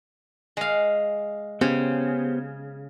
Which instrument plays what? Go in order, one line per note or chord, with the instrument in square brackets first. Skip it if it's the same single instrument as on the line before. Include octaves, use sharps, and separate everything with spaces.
[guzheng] G#3 F5
[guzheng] C#3 [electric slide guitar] B3 G4 C5